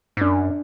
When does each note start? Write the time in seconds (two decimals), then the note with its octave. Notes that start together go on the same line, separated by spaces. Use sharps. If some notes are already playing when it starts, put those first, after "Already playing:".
0.17 G#2
0.21 F#2 D4